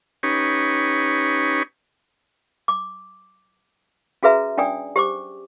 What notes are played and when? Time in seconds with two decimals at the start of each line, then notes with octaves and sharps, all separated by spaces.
0.23 C#4 D#4 G4 B4 C#5
2.68 D6
4.23 C#4 F#4 G#4 B4 E5 A#5
4.58 C#4 D4 D5 G5 G#5 D#6
4.96 G4 C5 D6